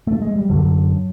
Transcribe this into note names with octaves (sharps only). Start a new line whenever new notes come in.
A3
G#3
G3
F#2 D3 F#3